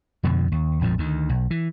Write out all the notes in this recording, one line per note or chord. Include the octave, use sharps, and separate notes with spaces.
F2 B2 D3 F3
D#2
A#1 F2 G#2 F3
D2 D#3
B1
E3